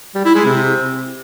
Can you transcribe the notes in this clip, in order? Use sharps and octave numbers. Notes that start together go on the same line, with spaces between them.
G3
E4
G#3
C3